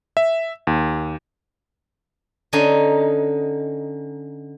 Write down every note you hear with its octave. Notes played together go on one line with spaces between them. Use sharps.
E5
D#2
D3 C#4 D#4 G#5 C6